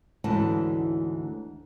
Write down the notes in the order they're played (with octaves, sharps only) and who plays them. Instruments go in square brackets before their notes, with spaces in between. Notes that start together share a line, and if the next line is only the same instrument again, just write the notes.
[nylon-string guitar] D2 G#2 E3 C#4 A5